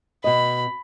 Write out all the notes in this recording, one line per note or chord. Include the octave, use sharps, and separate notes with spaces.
B2 D#5 B5